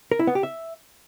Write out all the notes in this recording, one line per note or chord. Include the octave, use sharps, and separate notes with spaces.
A#4
E4
B3
G4
E5